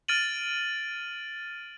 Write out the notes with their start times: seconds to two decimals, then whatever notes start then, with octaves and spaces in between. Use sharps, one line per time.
0.08 F6 A6 D7 D#7 F#7